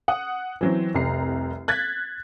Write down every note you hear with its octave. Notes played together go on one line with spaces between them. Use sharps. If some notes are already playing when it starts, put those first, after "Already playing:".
F#5 D#6
E3 F#3 C4
F1 C2 A#5 C7
F#6 G#6 A6 B6